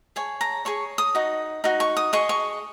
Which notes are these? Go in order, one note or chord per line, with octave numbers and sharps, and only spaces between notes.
G#4 C#5 G#5
A#5
G#4 C#5 C#6
D#6
D#4 F#4
D#4 F#4
C#6
D#6
G#4 D#5 C#6
C#6